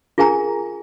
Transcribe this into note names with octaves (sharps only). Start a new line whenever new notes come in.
F4 G#4 A#4 G#5 A#5